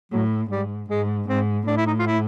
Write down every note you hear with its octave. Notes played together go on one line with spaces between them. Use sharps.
A2 F#3
G#2 G3
G#2 G#3
G#2 C4
A2 D4
E4
D#4
F4
E4